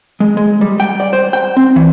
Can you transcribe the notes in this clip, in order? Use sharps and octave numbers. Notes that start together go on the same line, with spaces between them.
G#3
G#3
G3
G5
D5
C5
G5
C4
E3